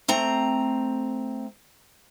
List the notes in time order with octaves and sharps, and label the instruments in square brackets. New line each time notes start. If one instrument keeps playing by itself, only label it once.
[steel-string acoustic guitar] A3 C4 A#5